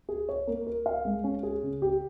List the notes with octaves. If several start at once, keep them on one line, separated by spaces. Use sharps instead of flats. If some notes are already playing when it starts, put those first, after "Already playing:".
G#4
C#5
A#3
A#4
F5
G#3
C#4
G#4
C#3
G4